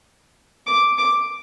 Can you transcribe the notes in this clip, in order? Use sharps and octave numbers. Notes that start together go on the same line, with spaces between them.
D6
D6